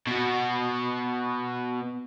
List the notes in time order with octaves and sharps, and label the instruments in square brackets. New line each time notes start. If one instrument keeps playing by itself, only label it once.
[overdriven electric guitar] B2 F#4